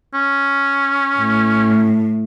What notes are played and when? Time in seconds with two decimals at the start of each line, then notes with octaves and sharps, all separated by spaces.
0.14 C#4
1.19 A2